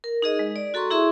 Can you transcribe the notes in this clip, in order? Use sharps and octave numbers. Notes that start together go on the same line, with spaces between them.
A#4
D#4 G#4 D#5
G#3
D5
F#4 A4 A#5 C6 C#6
E4 G#4 E5 C6 C#6